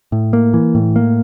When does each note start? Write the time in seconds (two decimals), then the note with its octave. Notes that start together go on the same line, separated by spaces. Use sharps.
0.12 A2
0.33 A#3
0.54 E3
0.75 A2
0.96 A#3